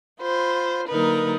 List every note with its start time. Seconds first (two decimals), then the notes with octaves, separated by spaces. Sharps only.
0.20 F4 C5 B5
0.87 D3 F#3 A#3 D#4 A#4 B4